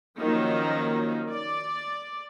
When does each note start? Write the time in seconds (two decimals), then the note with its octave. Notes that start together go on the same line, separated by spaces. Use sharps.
0.20 D#3 F3 F#3 A#3 C#4 D#4
1.30 D5